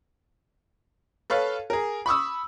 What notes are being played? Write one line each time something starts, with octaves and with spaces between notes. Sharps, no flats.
A4 B4 C#5 F5
G#4 A#4
B5 C#6 D#6 E6